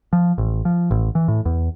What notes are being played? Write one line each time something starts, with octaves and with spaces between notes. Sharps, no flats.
F3
A1
F3
A1
E3
A2
E2